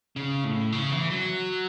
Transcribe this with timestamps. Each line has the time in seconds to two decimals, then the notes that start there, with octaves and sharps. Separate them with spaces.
0.16 C#3
0.44 A2
0.72 C#3
0.91 E3
1.10 F#3